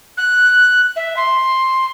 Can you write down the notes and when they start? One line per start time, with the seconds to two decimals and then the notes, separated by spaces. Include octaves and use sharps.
0.18 F#6
0.96 E5
1.17 C6